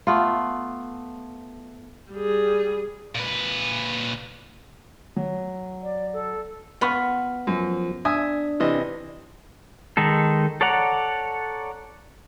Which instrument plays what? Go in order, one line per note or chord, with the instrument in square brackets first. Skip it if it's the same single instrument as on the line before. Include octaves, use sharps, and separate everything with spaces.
[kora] A3 B3 F4
[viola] G3 G#4
[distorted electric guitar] A#2 B4
[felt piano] F#3
[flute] D5
A4
[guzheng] B3 F4 [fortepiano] F#5 B5 C#6
[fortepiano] F#2 [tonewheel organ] F3
[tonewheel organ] D4 [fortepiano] E5 G#5 D#6
[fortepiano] C3 E3 D#5
[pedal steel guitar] D#3 G#3 D#4 A4
A4 C#5 D5 F#5 A#5